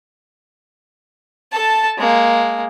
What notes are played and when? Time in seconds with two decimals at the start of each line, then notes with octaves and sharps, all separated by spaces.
1.52 A4 A5
1.98 G#3 A#3